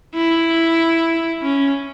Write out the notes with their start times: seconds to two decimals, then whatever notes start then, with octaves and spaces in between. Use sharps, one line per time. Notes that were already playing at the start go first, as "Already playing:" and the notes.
0.15 E4
1.43 C#4